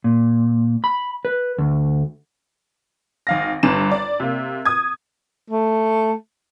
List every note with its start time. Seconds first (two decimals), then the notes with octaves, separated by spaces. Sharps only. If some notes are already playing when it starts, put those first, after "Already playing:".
0.04 A#2
0.84 B5
1.25 B4
1.58 D2
3.27 G#1 F5 A#6
3.63 G1 G2 E7
3.91 D5
4.20 C3 A#3
4.65 D#6 G#6
5.50 A3